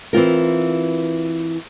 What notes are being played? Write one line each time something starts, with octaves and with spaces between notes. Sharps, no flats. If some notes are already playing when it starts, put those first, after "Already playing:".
E3 C4 F4 A#4